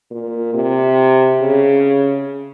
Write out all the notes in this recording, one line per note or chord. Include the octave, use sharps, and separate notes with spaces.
A#2
C3
C#3